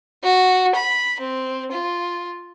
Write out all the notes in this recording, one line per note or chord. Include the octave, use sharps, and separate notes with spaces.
F#4
B5
C4
F4